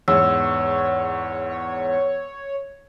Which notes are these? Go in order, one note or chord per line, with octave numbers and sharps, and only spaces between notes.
E2 G#2 C#5 E6